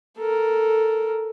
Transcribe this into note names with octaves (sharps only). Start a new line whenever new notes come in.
A4 A#4